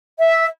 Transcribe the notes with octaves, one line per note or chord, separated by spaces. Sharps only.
E5